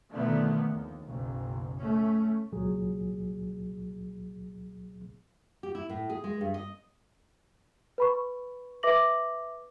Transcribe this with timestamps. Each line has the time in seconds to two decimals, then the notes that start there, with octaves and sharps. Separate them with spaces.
0.11 B2 D3 D#3 F3 A3 B3
0.66 D#2
1.05 F#1 B1
1.79 A3 C#4
2.52 C#2 A#2 F#3 G#4
5.63 G4
5.75 E4
5.90 A2
6.10 G#4
6.24 G#3
6.41 G2
6.54 D#5
7.98 B4 B5 C#6
8.83 B4 E5 D6 A#6 F#7